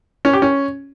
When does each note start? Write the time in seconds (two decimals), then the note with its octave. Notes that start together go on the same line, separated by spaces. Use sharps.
0.25 C#4
0.33 G4
0.42 C#4